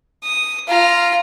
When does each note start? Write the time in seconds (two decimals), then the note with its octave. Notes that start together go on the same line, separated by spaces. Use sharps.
0.24 D#6
0.68 F4 A#5